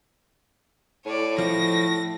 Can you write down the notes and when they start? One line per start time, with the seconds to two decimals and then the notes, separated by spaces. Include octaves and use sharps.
1.06 A2 C#5 D5
1.38 F3 A#6